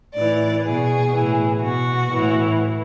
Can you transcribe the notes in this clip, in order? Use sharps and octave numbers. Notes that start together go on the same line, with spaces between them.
A2 E3 D5
B2 G#4
A2 E3
B2 F#4
A2 E3